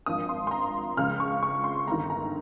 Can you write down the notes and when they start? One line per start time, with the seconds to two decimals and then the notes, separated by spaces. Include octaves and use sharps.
0.06 G#1 G2 F3 D#6
0.29 C6
0.47 C6
0.51 A#5
0.97 C#2 C#3 F3 F6
1.20 C#6
1.43 C#6
1.64 C6
1.87 G1 G2 D#3 A#5
2.10 A#5